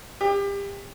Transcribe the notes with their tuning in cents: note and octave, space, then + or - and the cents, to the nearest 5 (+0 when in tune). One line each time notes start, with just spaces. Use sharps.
G4 +30